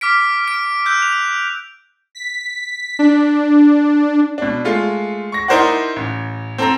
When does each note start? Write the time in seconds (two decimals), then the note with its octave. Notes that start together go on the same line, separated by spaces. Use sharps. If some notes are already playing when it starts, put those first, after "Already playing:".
0.01 D6 F6 B6 D7
0.44 F6 D7
0.85 E6 F#6 G6
1.02 F7
2.15 B6
2.99 D4
4.38 B2 D4
4.65 G#3 A3 F4
5.32 C#6 A#6
5.48 D#4 E4 A#4 C5 D5 F#5
5.96 A1
6.58 C4 A4 A#5